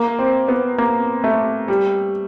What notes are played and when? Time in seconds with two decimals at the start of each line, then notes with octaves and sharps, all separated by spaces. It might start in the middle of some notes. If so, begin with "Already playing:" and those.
Already playing: A#3
0.19 C4
0.48 B3
0.78 A#3
1.24 A3
1.68 G3